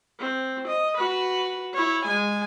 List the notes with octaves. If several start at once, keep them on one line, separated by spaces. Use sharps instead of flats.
C4
D#5
F#4 B4
E4 C#5
G#3 G#5